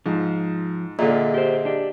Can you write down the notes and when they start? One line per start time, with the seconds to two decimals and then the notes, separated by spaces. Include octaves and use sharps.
0.06 G#2 F3
0.99 A#2 D3 F4 G#4 D#5 E5
1.34 G4 C5
1.65 D4 G4